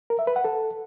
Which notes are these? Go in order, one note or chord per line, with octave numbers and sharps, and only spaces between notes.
A#4
E5
B4
F#5
A4